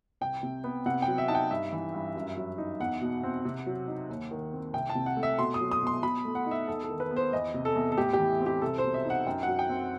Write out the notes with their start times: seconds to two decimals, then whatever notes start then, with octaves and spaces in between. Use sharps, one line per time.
0.21 C2 G5
0.43 C3
0.64 B3
0.86 C3 F#5
1.02 G5
1.08 F#3
1.18 E5
1.28 D#4 A5
1.35 G5
1.50 G2 E5
1.72 E3
1.94 G2
2.15 F#2
2.37 F#3
2.58 D#4
2.80 E2 F#5
3.01 B2
3.23 C4
3.45 C3
3.67 F#3
3.88 D#4
4.09 D#2
4.31 D#3
4.53 C4
4.73 C2 G5
4.90 A5
4.95 C3
5.06 F#5
5.17 A3
5.23 E5
5.39 B2 C6
5.54 D#6
5.60 F#3
5.72 D#6
5.82 B2 C6
6.03 B2 B5
6.25 A3
6.35 F#5
6.46 D#4
6.51 E5
6.68 E2 A4
6.84 A4
6.90 D#3
7.00 B4
7.11 B3
7.17 C5
7.33 E2 D#5
7.54 C3
7.65 A4
7.76 E2
7.92 A4
7.97 A2 G4
8.13 G4
8.19 E3
8.41 C4
8.46 G4
8.62 C2 A4
8.78 C5
8.84 B2
8.94 E5
9.05 D#4 F#5
9.27 F#2 G5
9.43 F#3 F#5
9.59 G5
9.70 C4